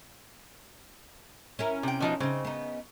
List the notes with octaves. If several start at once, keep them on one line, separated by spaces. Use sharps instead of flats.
C#4 E4 A#4
C3 G5
B2 F3 D#4
C#3 C4 D#4
B3 D#4